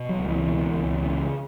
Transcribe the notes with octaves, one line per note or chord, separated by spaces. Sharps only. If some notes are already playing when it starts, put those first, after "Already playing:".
Already playing: B2
F#3
C#2
E3
B2
C#2
C#3